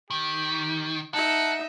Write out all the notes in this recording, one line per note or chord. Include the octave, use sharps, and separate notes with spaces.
D#3 G4
D#4 A4 E5 F#5